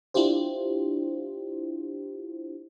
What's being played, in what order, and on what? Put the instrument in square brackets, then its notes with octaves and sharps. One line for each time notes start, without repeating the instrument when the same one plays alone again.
[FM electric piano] D4 E4 F4 G4 C5